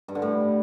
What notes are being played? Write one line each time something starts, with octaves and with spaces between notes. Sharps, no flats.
G2
D3
A2